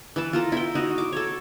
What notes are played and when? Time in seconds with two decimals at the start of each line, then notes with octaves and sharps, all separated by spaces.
0.16 E3 B4 A5
0.33 F4 A4 A#4
0.52 E4 G5
0.75 D#4 F#4
0.98 D6
1.13 A4 C#5